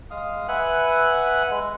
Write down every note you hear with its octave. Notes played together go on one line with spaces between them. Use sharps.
G#3 F5 D#6
B4 E5 F#5 G#5
G#3